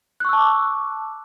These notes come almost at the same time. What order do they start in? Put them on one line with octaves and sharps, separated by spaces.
F#6 C#6 E6 A5 D6